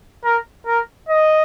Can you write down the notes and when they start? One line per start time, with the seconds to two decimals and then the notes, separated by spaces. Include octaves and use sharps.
0.24 A#4
0.67 A#4
1.09 D#5